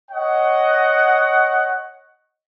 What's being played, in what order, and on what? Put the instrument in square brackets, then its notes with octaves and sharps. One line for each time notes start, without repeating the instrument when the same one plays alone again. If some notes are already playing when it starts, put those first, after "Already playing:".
[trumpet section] C#5 D#5 F#5